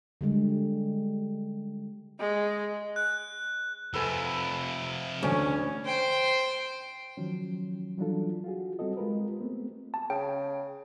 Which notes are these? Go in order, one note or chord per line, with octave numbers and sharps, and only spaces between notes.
D3 G3 G#3
G#3
F#6
F2 C3 A4 B4 G#5
D2 C#4
C5 G5
D#3 F3 F#3 C#4
E3 F#3 G3 D4 F4 A4
F4 F#4 G#4
G3 C4 F#4 A4 D#5
G#3 F4 G4 A#4 B4
A3 B3 C4
A5
C#3 G5